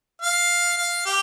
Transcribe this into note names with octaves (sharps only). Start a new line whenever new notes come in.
F5
F5
G4